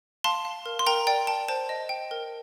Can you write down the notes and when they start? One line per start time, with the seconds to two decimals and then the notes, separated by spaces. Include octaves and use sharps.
0.24 F5 A5 C6
0.45 F5
0.66 A#4
0.79 C6
0.86 A#4 G5 A#5
1.07 D5 G5
1.27 G5 A5
1.48 C5 A5
1.69 D#5
1.89 G5
2.11 A#4